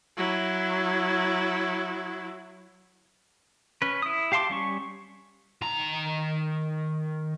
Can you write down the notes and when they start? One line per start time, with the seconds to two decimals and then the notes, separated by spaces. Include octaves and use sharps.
0.17 F#3 E4
3.82 C#4 B4
4.02 E4 D#6
4.32 G4 F5 A5 C6 D6
4.50 G3 C#4 C#6
5.62 D#3 A#5